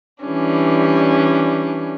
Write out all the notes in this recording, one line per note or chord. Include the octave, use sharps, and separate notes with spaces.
E3 G3 C#4 D4